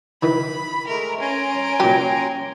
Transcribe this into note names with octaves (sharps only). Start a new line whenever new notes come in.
D#3 E3 B5
G#3 A3 A#4
C#4 G#5 A#5 C6 D7
A#2 F#3 G4